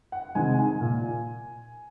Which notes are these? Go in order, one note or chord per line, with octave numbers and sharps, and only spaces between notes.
F#5
C3 D#3 G#3 G#5
G#5
A#2